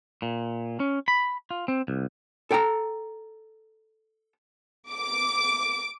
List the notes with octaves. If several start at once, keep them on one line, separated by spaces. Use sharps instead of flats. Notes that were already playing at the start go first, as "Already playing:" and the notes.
A#2
C#4
B5
F4
C4
C2
A4 G5 A5 A#5
D6